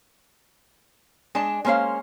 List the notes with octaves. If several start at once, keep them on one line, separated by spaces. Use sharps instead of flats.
G#3 D4 A5
G#3 A#3 C#4 C5 F5